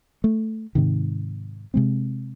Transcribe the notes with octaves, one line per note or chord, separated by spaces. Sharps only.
A3
G#2 C3 D#3
C3 G#3 C4